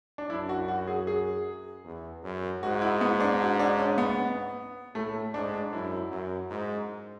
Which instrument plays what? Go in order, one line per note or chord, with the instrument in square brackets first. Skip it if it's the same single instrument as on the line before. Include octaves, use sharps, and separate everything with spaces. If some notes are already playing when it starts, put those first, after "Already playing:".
[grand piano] D4
[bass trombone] F#2 [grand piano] E4
[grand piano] F#4
F#4
G#4
G#4
[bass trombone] E2
F#2
[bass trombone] G#2 [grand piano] F#4
[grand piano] E4
B3
D4
F#4
D4
C#4
B3
[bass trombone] A2 [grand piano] A3
[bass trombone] G#2 [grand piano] D4
[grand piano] D4
[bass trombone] F#2 [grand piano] E4
[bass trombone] F#2
G#2